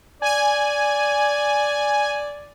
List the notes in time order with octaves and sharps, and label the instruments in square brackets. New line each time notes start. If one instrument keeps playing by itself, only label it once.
[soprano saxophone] D5 [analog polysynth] G#5